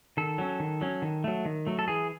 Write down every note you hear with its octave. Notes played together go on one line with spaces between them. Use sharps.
D#3 A4
F#3 C#4
D#3
F#3 C#4
D#3
F#3 A3
D#3
F#3 A3
A4
E3 G#4